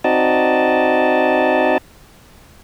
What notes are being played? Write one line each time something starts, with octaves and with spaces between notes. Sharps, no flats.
C4 D#4 F#4 D5 D#5 A5